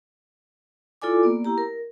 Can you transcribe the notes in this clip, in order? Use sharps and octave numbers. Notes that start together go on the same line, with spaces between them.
E4 F4 A4 D5 G#5 D6
A#3 B3 D5
E4 G4 A#5
A#4